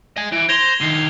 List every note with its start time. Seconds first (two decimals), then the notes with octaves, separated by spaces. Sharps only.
0.17 D#5 G#5
0.32 E3 D7
0.49 C5 C6 G#6 A#6 F7 G7
0.81 D3 D#3 C7